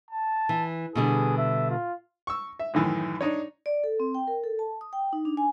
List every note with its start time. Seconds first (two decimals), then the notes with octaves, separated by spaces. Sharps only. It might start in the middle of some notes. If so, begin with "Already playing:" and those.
0.11 A5
0.49 E3
0.95 B2 D3 G3 G#4
1.38 E5
1.70 F4
2.27 C#6 E6
2.59 E5
2.74 F#2 A2 D#3 E3
3.21 D4 D#4 C#5
3.66 D5
3.84 A4
4.00 C4
4.15 G5
4.27 A#4
4.44 A4
4.59 A5
4.81 D#6
4.93 G5
5.13 D#4
5.25 D4
5.37 G#5